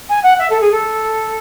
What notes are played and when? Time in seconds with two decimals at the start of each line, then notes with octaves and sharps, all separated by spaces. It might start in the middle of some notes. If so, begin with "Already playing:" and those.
0.09 G#5
0.23 F#5
0.39 E5
0.50 A4
0.61 G#4
0.72 A4